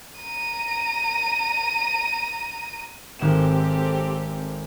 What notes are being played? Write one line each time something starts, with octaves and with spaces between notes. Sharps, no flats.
A#5 D#7
G#1 C4 G4 A4 E7